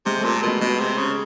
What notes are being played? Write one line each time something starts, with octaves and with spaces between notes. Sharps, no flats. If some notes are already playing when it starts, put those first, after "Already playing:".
C3 G#3
A#2 A3
B2 G#3
B2 G#3
C3
C#3